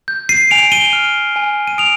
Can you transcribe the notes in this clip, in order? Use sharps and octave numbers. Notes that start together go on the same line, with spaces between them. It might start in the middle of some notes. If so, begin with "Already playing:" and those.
G6
C7 D#7
G#5 D7 F7
D#7 G7
F6
G#5
D#7
D#6 D7 F7